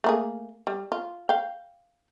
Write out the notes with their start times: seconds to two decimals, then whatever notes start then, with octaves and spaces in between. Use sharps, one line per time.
0.04 A3 A#3 G#4
0.67 G3
0.92 F4
1.29 F5 G5